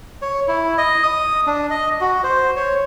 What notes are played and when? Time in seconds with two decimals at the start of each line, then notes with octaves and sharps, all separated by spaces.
0.22 C#5
0.48 E4
0.78 D#5
1.03 D#6
1.47 D4
1.70 D#5
2.01 F#4
2.24 C5
2.56 C#5